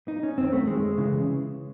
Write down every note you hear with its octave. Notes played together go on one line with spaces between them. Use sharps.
D#4
C#4
F#2 D#3 C4
A3
G#3
C#3 E3